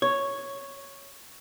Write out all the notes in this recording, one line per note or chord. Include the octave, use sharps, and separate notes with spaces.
C#5